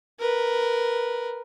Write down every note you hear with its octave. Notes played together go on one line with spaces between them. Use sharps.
A#4 B4